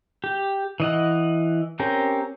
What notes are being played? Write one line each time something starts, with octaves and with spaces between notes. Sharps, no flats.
G4
E3 D#5 F#5
C4 C#4 G4 A#4